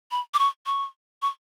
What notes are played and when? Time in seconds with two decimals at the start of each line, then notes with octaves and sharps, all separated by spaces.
0.11 B5
0.34 D6
0.39 C#6
0.66 C#6
1.22 C#6